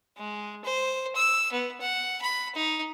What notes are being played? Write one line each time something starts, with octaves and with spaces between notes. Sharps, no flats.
G#3
C5
E6
B3
F#5
B5
D#4